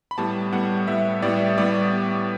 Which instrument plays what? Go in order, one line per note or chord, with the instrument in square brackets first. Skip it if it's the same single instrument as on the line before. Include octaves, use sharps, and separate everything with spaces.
[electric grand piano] B5
A2 G3 B3 A5
A2 G3 B3 F#5
A2 G3 B3 E5
A2 G3 B3 D5
A2 G3 B3 D5